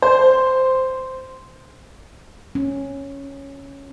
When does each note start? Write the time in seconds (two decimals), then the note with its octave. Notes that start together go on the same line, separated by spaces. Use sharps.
0.02 C5
2.55 C#4